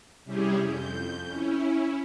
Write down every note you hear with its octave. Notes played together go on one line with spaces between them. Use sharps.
C3 G3 C#4 E4 G4 G#4
F2 G6
C#4 E4